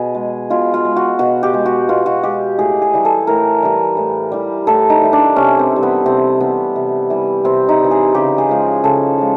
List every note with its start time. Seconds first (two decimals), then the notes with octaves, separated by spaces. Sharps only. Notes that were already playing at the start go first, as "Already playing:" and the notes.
Already playing: B2 G#4
0.15 G#3
0.50 B2 F4
0.74 F4
0.85 G#3
0.96 F#4
1.19 B2 F#4
1.43 G4
1.54 G#3
1.66 F#4
1.89 B2 F4
2.06 F#4
2.23 G#3 G4
2.59 A2 G#4
2.82 G#4
2.93 E3 G3
3.05 A4
3.27 A2 A#4
3.63 E3 G3
3.97 A2
4.32 E3 G3
4.67 A2 A4
4.90 D#4
5.02 E3 G3
5.13 D4
5.36 C3 C#4
5.59 C4
5.71 E3
5.76 G3
5.83 B3
6.06 C3 C4
6.40 E3 G3 B3
6.76 C3
7.10 E3 G3
7.44 C3 C4
7.69 D#4
7.79 G3
7.84 E3
7.91 G#4
8.15 C#3 G4
8.38 G#4
8.49 F3 G#3
8.84 C#3 A4
9.18 F3 G#3